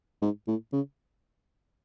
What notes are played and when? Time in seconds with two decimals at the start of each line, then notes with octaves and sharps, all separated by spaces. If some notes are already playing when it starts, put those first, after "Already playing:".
0.22 G#2
0.48 A2
0.73 C#3